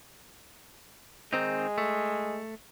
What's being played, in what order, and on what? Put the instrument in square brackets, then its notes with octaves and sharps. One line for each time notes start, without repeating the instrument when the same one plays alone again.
[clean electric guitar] D#3 C4 D#4 [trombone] G#3
[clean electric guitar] A3